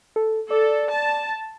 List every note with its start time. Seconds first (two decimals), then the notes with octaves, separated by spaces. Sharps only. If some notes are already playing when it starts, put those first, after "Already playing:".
0.16 A4
0.51 A4 D5
0.91 A5